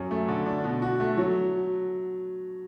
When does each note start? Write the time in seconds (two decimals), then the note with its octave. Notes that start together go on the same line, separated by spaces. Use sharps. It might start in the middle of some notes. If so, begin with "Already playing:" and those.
Already playing: F#2 F#3
0.11 A3
0.28 D3
0.46 D4
0.64 B2
0.82 F#4
1.00 A3
1.17 F#3